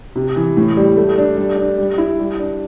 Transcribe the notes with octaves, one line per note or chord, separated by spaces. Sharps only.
C3
E3
A2
G3
A3
D4
G3
D4
G3
E4
G3
D4